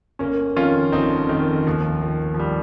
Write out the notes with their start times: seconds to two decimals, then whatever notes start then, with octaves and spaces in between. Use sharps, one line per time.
0.19 G1 A#3 C#4
0.56 F2 D#3 C#4 F4
0.92 G1 C4 D#4
1.29 F2 D#3
1.67 D#2 F3
2.02 D#3
2.34 F3
2.39 G3